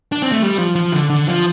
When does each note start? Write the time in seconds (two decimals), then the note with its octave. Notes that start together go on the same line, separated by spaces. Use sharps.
0.12 D4
0.22 C4
0.32 A3
0.42 G3
0.59 F3
0.76 F3
0.93 D3
1.10 D3
1.27 F3